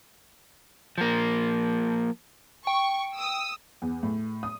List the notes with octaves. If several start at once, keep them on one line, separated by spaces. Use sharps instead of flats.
F3 A#3
G5 C#6
D#6 E6
E2
A2
D#6